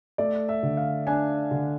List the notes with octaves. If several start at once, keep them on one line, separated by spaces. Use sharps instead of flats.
A3 D5
E5
D3
F5
D4 G#5
D3